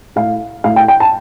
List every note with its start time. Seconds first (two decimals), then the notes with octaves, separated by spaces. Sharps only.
0.16 A2 F5
0.64 A2 F5
0.76 G5
0.88 G5
1.00 A5